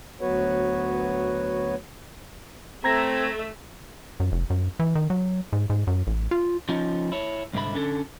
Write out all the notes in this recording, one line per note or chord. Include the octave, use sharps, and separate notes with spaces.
D2 F#3 B3 F#4 B4 C#5
A3 C4 E5 A#5 G#6 A#6
F#2
F1
F#2
E3
D#3
F#3
G#2
G#2
F#2
A1
F4
F3 C#4 D#4
E4 C#5
C2 G#2 D3 E5 B5
D3 C#4 A4